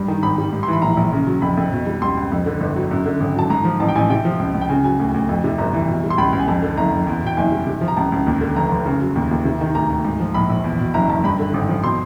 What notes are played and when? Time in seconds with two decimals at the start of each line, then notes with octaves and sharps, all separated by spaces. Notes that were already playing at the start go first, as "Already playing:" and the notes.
Already playing: G2 G3
0.08 D#3
0.23 G#1 B5
0.38 G3
0.53 G#2
0.63 C6
0.68 E3
0.73 B5
0.82 A#1 A#5
0.97 A#1
1.12 C#3
1.27 F#3
1.42 F2 B5
1.57 F2
1.72 B2
1.87 G3
2.01 C#2 C6
2.17 C#2
2.32 F2
2.46 D3
2.61 G1
2.76 F#3
2.91 F#2
3.06 D3
3.20 G#1
3.36 F#3 A5
3.50 G#2 A#5
3.65 F3
3.80 A1 A5
3.89 G5
3.95 A1 G#5
4.10 C3 G5
4.25 F3
4.39 C#2
4.54 C#2
4.61 G5
4.69 C#3 G#5
4.84 F#3 G#5
5.00 D2
5.14 D2
5.29 F2
5.44 C3
5.58 G1 A#5
5.73 E3
5.88 B2
6.04 G3
6.10 C6
6.18 C#2 B5
6.33 C#2
6.39 G#5
6.48 F2 A5
6.63 D3
6.77 F#1 A#5
6.93 F#1
7.07 E2
7.23 B2 G5
7.37 F#1 G#5
7.52 G3
7.67 C3
7.81 F3
7.88 A#5
7.97 C#2 A5
8.12 C#2
8.27 D#2
8.41 D3
8.56 F1 A#5
8.71 F1
8.86 C#3
9.01 F#3
9.16 D#2
9.31 D#2
9.45 C3
9.61 D#3
9.75 D2 A#5
9.90 D2
10.05 G#2
10.20 F3
10.34 A#1 B5
10.50 A#1
10.64 E2
10.79 B2
10.94 F#1 A#5
11.09 F#1 A5
11.24 G2 B5
11.39 D3
11.54 G#1
11.69 F3
11.83 B2 C6